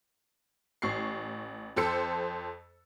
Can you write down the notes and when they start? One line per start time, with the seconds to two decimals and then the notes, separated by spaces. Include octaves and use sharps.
0.82 A1 C#6 C7
1.76 F2 A4 C5 E6 C#7